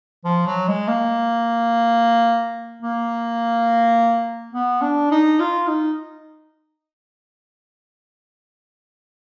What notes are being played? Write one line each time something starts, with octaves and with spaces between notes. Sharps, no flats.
F3
F#3
G#3
A#3
A#3
B3
D4
D#4
F4
D#4